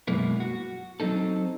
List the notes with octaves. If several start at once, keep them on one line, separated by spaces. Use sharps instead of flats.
F#2 B2 G#3 A#3 B3 E4
F#4
F#3 C4 D#4 A4